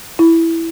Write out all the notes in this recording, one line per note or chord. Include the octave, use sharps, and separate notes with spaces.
E4